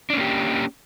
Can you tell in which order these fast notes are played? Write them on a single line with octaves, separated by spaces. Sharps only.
D4 C#4 A#3 G4